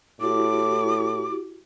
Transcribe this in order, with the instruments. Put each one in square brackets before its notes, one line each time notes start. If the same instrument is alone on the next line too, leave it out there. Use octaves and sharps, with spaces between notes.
[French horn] A2 [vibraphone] E4 F#4 G4 [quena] D6